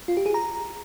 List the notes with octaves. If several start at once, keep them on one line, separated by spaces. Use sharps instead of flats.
F4
G4
G#4
A#5